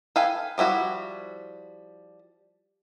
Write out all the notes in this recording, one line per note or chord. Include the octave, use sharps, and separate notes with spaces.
A4 B4 F5 G5 G#5
F3 G3 E4 F#4